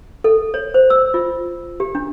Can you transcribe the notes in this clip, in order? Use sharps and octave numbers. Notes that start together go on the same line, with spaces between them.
A4
C#5
C5
E6
F4
G4
D4